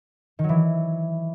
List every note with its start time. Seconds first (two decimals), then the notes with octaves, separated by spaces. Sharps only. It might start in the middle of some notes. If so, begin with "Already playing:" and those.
0.39 D#3
0.44 F#3
0.49 E3